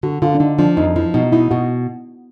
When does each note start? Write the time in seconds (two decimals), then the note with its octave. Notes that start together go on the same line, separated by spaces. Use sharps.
0.03 D3 F#4
0.22 D3 F4
0.35 D4
0.40 D3 D#4
0.59 F3 D4
0.77 F2 D#4
0.96 F3 E4
1.14 B2 D#4
1.32 D#4 E4
1.51 B2 F#4